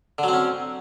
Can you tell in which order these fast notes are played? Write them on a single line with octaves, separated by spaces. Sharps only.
D3 F#3 C4 C#4